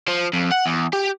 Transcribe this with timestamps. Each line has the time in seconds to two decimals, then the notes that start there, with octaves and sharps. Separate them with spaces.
0.08 F3
0.33 F2
0.51 F#5
0.66 E2
0.93 G4